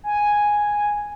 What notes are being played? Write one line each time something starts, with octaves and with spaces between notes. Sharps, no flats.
G#5